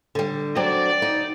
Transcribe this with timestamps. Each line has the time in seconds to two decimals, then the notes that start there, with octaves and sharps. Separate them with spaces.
0.15 D3 G3
0.56 F#3 C4 D4 D5
1.02 D#4